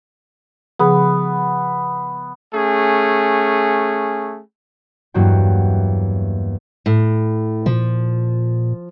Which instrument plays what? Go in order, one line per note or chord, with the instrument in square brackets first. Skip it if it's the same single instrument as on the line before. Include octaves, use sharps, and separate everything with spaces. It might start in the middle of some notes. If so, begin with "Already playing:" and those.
[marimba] C#3 F3 G#4 [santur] B3
[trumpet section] A3 C#4 G#4
[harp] E2 G2 F#3 A#3 F#4 G5
[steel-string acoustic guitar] A2
[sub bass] A#2 [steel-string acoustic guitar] F3